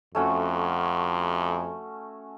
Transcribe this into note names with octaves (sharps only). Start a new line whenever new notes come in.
F2 A3 C#4 F#4